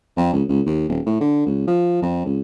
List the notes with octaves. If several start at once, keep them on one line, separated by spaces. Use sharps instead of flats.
F2
C#2
C#2
D#2
D#1
A2
D3
C#2
F3
F2
C#2